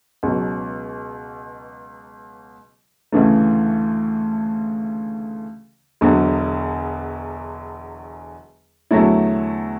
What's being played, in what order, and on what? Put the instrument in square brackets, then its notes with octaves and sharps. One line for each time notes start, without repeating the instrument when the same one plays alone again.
[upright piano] C#2 B2 F#3
D2 C#3 E3 A3
E1 E2 D3 F#3
E2 D3 F#3 A3 E4